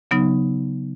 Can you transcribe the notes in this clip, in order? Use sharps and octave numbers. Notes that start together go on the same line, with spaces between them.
C#3 F#3 B3 D#4